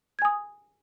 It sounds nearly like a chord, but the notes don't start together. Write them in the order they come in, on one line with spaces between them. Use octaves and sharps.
G#6 G#5 D#6